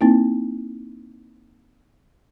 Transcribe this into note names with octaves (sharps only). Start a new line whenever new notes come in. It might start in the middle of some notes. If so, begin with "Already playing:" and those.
A#3 C4 D#4 E4